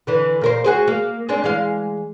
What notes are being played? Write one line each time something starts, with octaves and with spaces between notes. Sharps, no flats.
D3 E3
A#2 A#4 C5
F#4 G#4 C5
A#3
G#3 C4 D4
E3 G#3 F5